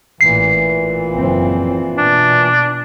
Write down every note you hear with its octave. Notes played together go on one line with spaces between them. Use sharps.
A1 A#2 E3 C7
F#1 F3 C4
B2 D4